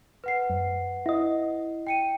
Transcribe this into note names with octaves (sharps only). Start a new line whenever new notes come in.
B4 F#5 C7
F#2
E4 D#5
G5 C#7 D#7